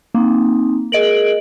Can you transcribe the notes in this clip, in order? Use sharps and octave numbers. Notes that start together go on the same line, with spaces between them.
A#3 C4 D#4
G#4 A#4 D#5 D7 F#7